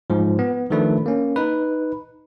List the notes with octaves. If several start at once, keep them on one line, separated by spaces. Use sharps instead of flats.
G#2 F3
B3
D#3 F3 A3 D4 B4
A#3 C#4
D#4 B4